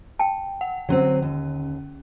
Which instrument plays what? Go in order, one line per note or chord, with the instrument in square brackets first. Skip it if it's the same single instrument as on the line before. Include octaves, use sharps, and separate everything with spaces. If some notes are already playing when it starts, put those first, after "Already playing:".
[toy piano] G5 A5
[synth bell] F#5
[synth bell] D3 C#4 [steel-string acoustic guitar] F#3 C4
[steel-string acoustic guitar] D#2